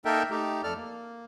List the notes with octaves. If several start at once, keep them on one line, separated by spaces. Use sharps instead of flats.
A#3 D#4 A4 A#4 E5 G5
A3 D#4 G4
F2 A4 D5 F6
A#3